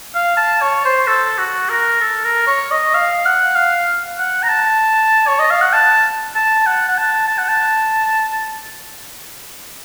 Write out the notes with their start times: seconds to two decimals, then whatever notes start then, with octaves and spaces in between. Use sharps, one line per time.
0.15 F5
0.37 A5
0.62 C#5
0.85 C5
1.07 A4
1.39 F#4
1.69 A#4
2.01 A4
2.25 A#4
2.47 C#5
2.71 D#5
2.94 F5
3.25 F#5
3.56 F5
4.19 F#5
4.43 A#5
4.49 A5
5.27 C#5
5.39 D#5
5.50 F5
5.61 F#5
5.73 A5
6.35 A5
6.66 F#5
6.88 F#5
6.98 A5
7.28 A5
7.38 F#5
7.49 A5